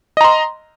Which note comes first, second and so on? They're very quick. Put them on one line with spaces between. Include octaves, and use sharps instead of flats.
D#5 A#5 C6